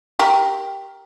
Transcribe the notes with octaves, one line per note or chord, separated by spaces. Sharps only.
G4 A#4